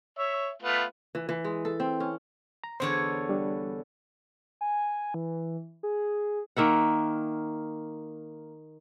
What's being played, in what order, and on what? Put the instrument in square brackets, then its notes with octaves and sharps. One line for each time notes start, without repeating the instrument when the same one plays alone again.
[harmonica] C#5 E5
A3 B3 F4
[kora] E3
E3
G#3
A4
C4
C#4
[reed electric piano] A#5
[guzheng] E2 D3 C#5 [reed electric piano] C5
[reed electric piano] G3 D4
[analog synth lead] G#5
E3
G#4
[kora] D#3 A#3 E5 F#5